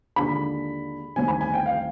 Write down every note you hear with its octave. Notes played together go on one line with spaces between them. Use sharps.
D#2 D3 G#3 D4 F4 B5
D2 C3 D#3 G3 C4 G#5
B5
G#5
G5
F5